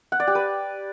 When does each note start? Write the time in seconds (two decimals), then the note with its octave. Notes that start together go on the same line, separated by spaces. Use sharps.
0.12 F#5
0.20 D5
0.27 G4
0.35 B4